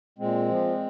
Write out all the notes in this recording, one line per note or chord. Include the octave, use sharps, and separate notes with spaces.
A#2 G#3 C4
F3